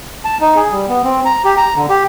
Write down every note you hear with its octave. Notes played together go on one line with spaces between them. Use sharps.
A5
D#4
G#4
G3
B3
C4
A#5
G4
A#5
D3
G4